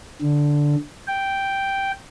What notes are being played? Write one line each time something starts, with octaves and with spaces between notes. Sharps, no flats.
D3
G5